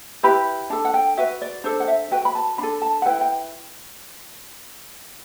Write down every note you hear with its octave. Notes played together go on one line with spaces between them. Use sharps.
E4 G4 B4 B5
D4 A4 A5
F#5
G5
F#4 B4 E5
D5
D4 A4 C5
F#5
E5
F#4 B4 G5
B5
A5
D4 A4 B5
A5
F#5
E4 B4 G5
G5